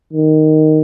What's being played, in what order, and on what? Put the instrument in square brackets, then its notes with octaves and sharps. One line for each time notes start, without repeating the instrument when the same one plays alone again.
[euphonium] D#3